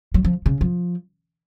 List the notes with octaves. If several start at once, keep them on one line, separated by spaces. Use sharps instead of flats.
F#3
F3
C#3
F3